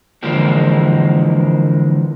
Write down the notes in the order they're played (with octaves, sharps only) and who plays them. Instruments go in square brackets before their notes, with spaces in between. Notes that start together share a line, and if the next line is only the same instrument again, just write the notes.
[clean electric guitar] D3 E3 F3 G#3 A#3 C4